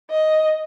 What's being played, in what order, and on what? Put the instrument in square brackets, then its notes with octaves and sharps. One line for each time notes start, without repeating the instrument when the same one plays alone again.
[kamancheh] D#5